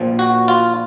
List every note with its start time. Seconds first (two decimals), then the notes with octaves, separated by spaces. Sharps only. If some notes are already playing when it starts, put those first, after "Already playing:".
Already playing: A#1 A#2 F3
0.19 F#4
0.48 F4